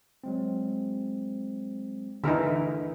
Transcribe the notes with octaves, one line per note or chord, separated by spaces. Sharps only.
F#3 G#3 C4
D3 E3 D#4 A#4 E5